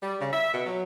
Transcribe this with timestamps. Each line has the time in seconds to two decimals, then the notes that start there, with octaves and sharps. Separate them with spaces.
0.03 G3
0.21 C#3
0.33 E5
0.54 B2
0.66 F#3